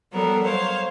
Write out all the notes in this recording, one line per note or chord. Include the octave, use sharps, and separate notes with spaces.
F#3 G3 B3 A4 A#4
C5 C#5 F5